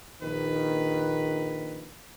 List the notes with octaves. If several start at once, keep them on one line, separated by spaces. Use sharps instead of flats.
A#1 D#3 B4